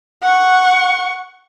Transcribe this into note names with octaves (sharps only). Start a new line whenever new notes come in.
F#5 C#6